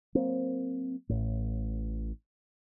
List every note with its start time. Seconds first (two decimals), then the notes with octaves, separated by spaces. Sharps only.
0.15 F#3 A#3 C4
1.09 A1 A2